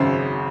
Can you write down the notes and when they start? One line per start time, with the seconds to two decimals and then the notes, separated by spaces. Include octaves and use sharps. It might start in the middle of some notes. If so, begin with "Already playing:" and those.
Already playing: G#1 F#2 C#3 C5 C6